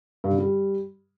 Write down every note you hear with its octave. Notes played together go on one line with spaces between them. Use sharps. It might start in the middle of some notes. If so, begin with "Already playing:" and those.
G2
D3
G3